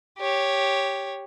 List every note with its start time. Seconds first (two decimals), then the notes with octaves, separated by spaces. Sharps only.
0.19 G4 C#5